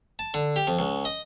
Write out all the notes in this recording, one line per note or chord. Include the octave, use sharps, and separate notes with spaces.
A5
D3
G4
F2
C#2
D#5